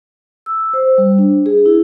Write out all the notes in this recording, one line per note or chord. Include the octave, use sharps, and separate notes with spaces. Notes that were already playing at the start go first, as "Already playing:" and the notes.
E6
C5
G3
D4
G#4
E4